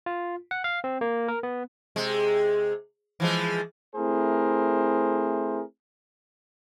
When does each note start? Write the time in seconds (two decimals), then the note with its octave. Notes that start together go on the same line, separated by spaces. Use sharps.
0.06 F4
0.51 F#5
0.64 F5
0.84 C4
1.01 A#3
1.28 A#4
1.43 B3
1.96 C3 G#3
3.20 E3 F3 G#3
3.96 A3 C4 E4 G#4 A#4 C5